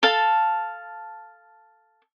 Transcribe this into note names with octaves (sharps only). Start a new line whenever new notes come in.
A4 F5 A5